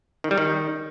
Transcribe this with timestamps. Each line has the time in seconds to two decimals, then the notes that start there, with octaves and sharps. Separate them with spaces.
0.24 D#3
0.31 G3
0.38 D#3